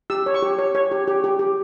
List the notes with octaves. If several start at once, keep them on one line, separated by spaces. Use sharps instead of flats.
G4 E6
C#5
C#6
G4
C#5
C#5
G4
G4
G4
G4